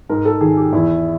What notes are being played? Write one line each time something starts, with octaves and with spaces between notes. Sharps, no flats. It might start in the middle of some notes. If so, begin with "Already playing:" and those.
G#2 A#4
A4
D#3 G#4
G4
E2 E4